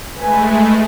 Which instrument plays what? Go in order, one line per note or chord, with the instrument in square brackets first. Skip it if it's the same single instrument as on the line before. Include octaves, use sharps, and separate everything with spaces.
[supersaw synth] G#3 A3 [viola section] B4 G#5